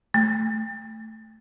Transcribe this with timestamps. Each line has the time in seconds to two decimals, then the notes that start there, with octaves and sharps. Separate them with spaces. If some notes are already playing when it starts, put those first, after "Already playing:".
0.14 A3